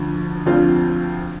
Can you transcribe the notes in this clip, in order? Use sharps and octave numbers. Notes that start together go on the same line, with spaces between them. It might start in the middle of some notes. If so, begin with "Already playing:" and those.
Already playing: D2 D3 F3
D2 D3 F3 C4 F4